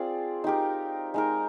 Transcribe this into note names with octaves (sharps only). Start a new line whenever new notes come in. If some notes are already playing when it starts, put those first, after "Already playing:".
Already playing: C4 F4 G#4 D5
D#4 G4 A#4
G#3 D#4 A#4